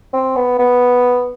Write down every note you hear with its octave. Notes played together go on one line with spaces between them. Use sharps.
C4
B3
B3